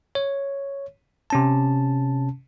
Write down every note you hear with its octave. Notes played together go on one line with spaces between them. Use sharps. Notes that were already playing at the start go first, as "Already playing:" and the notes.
C#5
C3 C#4 A5